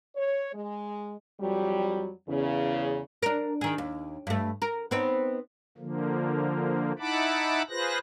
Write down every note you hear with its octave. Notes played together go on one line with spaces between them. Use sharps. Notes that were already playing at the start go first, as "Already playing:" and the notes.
C#5
G#3
F2 F#3 G3
E2 C#3
D4 A#4
D#3 G#4
D#2
G2 A3
A#4
B3 C4 D#4
D3 F3 A#3
D#4 E4 F#5 A5 B5 D6
F4 G#4 B4 C5 F#6 A#6